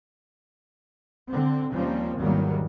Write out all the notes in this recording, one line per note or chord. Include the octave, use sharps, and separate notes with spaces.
D3 C4
D#2 F3 G3 A#3 C4 C#4
G#1 E2 D#3 F#3 G3 A#3